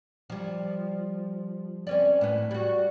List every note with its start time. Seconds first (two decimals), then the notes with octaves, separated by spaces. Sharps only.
0.30 F3 G3
1.87 C4 C#4 D5
2.21 A2 B4
2.51 G3 F#4